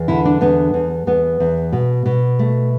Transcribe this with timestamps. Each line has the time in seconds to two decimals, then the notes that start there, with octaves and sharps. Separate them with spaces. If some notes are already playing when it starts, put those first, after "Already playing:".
Already playing: E2
0.08 D3 E4
0.25 D4
0.41 E2 B3
0.74 E2
1.07 E2 B3
1.40 E2
1.72 B2
2.06 B2
2.39 A3